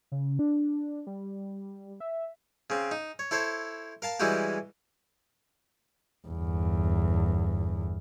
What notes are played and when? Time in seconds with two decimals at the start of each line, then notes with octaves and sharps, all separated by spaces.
0.12 C#3
0.39 D4
1.07 G3
2.00 E5
2.70 C#3 C4
2.91 D#4
3.19 C#5
3.31 E4 A4 C5 C#5
4.02 A#4 F5 A5
4.20 E3 G3 G#3 E4 F#4 G4
6.28 G1 E2